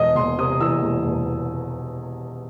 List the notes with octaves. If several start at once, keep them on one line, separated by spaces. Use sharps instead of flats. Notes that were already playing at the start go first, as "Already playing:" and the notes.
Already playing: E1 D#5
E1 C6
C3 D#6
E2 E6
E1
E1